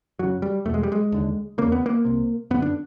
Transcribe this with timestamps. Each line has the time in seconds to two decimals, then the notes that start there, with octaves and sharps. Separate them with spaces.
0.19 F#2 C#3 F#3
0.42 G3
0.65 E2 B2 A3
0.74 G#3
0.83 G3
0.92 G#3
1.12 D#2 D3
1.58 E2 C#3 A#3
1.72 B3
1.86 A#3
2.05 C2 C3
2.50 F#2 D3 B3
2.62 D4